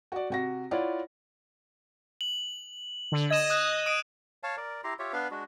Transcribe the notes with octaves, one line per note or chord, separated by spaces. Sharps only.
F#4 D5
C3 F#4 A#6
E4 F4 C#5 D5 F#5
F#7
D3
D#5 G#6 E7
D#6 F#6 E7
D#6 D7 D#7
C#5 F5 A5
A#4 D5
E4 G4 A#5 C6
F4 G4 C#5 E5
B3 D4 B4 F5
G#3 D4 F#4